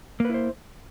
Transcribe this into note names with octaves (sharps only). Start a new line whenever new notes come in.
A#3 E4 B4 C5